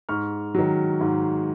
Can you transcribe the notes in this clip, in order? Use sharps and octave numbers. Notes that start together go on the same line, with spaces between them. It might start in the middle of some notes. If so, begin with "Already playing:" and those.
G#2 C#6 F6
D#3 F#3
G#2